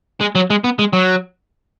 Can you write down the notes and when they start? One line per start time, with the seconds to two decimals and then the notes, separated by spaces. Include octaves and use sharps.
0.21 G#3
0.35 F#3
0.50 G#3
0.64 B3
0.79 G#3
0.93 F#3